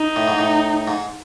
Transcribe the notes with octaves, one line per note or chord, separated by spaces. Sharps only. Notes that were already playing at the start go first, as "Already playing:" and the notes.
Already playing: D#4
A2
G#2
A2
G#2